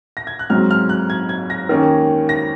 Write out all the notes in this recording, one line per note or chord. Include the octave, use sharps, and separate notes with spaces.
A#6
G#6
F#6
G#2 F#3 C4 F6
F6
F#6
G#6
G#6
A#6
D#2 D#3 A#3 C#4
A#6